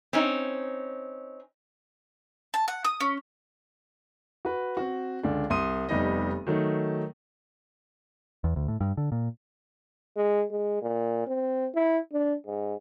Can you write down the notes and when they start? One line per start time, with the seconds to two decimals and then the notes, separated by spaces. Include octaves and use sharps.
0.13 C4 C#4 D#4
2.54 A5
2.68 F#5
2.85 D#6
3.00 C#4
4.45 F#4 B4
4.77 C4 F#4
5.23 C#2 D3 D4
5.50 C2 C6 D#6 D#7
5.89 F1 G3 B3 D#4 D#5
6.47 D#3 F#3 A3 D#4
8.44 E2
8.56 D2
8.68 A2
8.81 G2
8.97 D3
9.12 A#2
10.16 G#3
10.51 G#3
10.82 A#2
11.27 C4
11.75 E4
12.13 D4
12.47 G#2